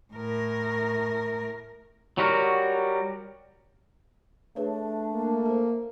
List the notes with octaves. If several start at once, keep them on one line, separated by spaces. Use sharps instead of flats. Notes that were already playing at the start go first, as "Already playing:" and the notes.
A2 A#4
F#3 G3 F#4 A#4
A3 D4 G#4 B4 C#5
A#3
A4 C5